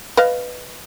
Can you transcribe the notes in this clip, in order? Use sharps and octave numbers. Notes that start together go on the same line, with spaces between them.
B4 D#5 F5